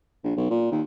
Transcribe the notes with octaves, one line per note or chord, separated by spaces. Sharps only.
A#1
B1
A#2
D#2